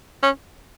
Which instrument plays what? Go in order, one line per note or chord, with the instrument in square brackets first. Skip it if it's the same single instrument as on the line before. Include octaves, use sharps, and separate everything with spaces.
[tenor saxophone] C#4